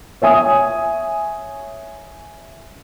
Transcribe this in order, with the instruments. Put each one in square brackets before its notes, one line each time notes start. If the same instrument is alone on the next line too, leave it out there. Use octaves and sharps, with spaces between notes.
[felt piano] C#5 E5 G#5 D#6